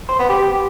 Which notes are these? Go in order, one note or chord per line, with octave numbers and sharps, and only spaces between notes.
C5
B3
G4